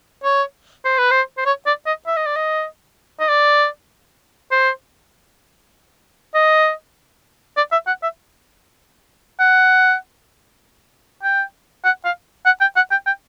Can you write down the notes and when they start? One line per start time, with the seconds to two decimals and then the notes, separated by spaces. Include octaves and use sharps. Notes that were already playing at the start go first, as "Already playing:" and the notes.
0.24 C#5
0.85 C5
0.98 B4
1.11 C5
1.37 C5
1.46 C#5
1.66 D5
1.86 D#5
2.07 E5
2.16 D#5
2.26 D5
2.36 D#5
3.20 D#5
3.29 D5
4.51 C5
6.34 D#5
7.57 D5
7.72 E5
7.87 F#5
8.03 E5
9.40 F#5
11.23 G5
11.84 F#5
12.05 F5
12.46 F#5
12.61 G5
12.76 F#5
12.91 G5
13.06 G5